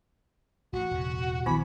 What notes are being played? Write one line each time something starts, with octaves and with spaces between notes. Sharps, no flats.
A1 F#4
E1 A2 C#3
A#1 D#3 B3 E4 B5